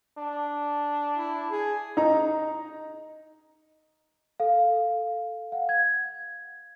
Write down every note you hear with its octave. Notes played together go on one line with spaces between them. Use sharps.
D4
E4
G#4
D#4 A#5
A4 F5
F5 F#5
G#6